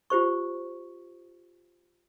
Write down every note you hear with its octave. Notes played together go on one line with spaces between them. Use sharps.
F4 G4 C5 C#6